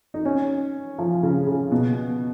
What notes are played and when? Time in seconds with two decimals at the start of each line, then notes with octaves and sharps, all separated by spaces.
0.14 D#4
0.25 C#4
0.98 F3
1.23 C#3
1.47 C#3
1.71 B2